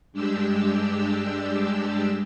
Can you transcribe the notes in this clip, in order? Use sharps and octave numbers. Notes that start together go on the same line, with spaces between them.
G2 G#3 D4 G4 E6